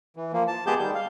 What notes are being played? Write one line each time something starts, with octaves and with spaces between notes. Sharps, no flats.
E3
F3 A#3
A5
G#3 B3 G4 G#4 A5 G6
D#3 G3 G6
F5